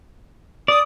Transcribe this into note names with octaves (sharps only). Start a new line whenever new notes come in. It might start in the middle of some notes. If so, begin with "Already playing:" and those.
D5 D#6